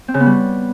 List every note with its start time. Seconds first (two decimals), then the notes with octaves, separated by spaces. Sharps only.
0.08 C4
0.14 C#3
0.20 B3
0.26 G3